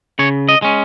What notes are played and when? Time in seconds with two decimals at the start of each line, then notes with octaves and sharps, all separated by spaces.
0.19 C#3 C#5
0.49 D#5
0.62 G#3 C#4